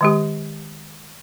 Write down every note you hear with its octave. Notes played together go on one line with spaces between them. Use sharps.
D#3 G#3 G4